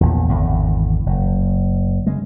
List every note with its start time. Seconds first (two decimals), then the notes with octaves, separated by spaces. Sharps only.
0.01 A#1 E2
0.28 G#1 E2 D3
1.06 F#1
2.07 C#3 G#3